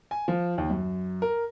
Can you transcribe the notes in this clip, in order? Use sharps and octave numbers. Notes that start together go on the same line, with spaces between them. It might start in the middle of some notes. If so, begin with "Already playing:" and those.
G#5
F3
D#2
F#2
A#4